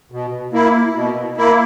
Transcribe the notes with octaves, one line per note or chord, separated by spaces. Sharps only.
B2
A#3 E4
B2
A#3 E4